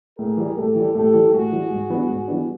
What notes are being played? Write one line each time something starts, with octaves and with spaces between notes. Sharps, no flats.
A2 G#4 A#4
E3 G3
A2 G4 A4
E3 G3
A2 G4 A4
E3 G3
A2 F#4 G#4
E3 G3
G#2
E3 G3 B3 D4
G#2
E3 G3 B3 D4